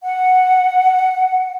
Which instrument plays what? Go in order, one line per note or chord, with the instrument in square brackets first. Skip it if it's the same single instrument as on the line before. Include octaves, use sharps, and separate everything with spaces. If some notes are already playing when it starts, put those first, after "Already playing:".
[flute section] F#5